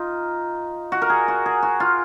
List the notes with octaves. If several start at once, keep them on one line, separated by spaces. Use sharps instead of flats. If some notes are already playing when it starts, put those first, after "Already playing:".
Already playing: D#4 F4
F#4
A#4
G#4
F#4
G#4
F#4
F4